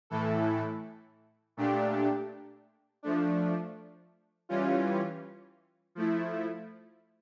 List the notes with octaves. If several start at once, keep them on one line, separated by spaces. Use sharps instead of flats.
A2 E3 A3 E4 A4
A#2 A3 D4 G4
F3 A3 D4
E3 G3 C#4 F4
F3 A3 E4